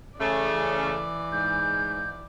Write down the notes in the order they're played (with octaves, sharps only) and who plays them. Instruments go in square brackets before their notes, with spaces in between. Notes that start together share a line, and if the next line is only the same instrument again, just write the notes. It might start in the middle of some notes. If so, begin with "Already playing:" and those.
[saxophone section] C#3 A3 [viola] E3 D5
[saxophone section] G#2 [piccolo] G6